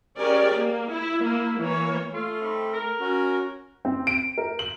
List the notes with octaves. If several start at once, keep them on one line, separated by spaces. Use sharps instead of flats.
C#4 G4 G#4 A#4 D5
A#3
E4
A#3 E4
E3 A#3 C#5
A3 C#4 F4
G3 C4 D#4
A#4
C#4 F#4
C4
D7
A#4
F#7